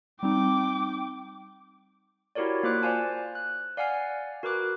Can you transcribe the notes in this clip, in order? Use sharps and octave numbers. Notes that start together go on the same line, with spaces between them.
G3 C4 D#4 G5 D6
E4 F#4 G4 A#4 C#5 D5
A#3 F4 C5 D6 F#6
C5 D5 F5 G#5 A5
F#6
D5 F5 F#5 G#5 F6 C7
F#4 A#4 B4 D6 F#6